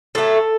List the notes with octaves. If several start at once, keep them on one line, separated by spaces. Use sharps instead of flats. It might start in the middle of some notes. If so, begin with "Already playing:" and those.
A2 F#3 A3 A4